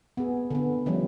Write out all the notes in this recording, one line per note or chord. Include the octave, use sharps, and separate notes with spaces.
B3 G#4
D3 B3
D#3 F3 G3 A3 C#4